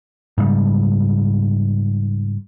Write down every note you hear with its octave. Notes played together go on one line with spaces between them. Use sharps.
G#2 C#3 G3